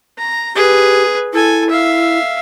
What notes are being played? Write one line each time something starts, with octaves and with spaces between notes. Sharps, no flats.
A#5
G4 G#4 B4
E4 A4 G#5
E5 F5